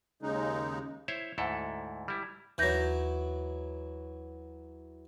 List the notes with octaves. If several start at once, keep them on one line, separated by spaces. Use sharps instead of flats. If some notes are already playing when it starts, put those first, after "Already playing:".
D#2 C#3 G#3 D#4
E4 C5 C#5 E5
D2 G#2 E4 A4
G3 E4
D#2 E3 F#3 G6 A#6